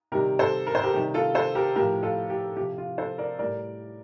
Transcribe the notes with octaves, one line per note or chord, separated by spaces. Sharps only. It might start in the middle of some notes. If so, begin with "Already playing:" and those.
C3 D#3 G3 G4 A#4
A4 C5
A#4
C5
G4 A#4
C3 D#3 G3 G4
F4 A4
A4 C5
G4 A#4
A2 F3 G4 A#4
F4 A4
G4
C3 F3 G4
F4
A4 C5
A#4 D5
A2 G3 A#4 D5